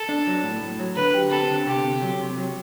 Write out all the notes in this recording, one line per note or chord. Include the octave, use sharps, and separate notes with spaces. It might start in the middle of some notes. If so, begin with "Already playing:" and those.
Already playing: A4
D4
F#3
A2
A2
F#3
D3 B4
G4
C4 A4
D3
C3 G4
C3
F#3
C3
F#3